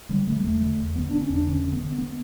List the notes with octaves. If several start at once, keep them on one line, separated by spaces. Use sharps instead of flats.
D3 G3
D3 A3
G3
E2 A3
D3
E2
D3 B3
D3 D4
C#4
E2 D4
D3 C#4
D3
B3
D3
B3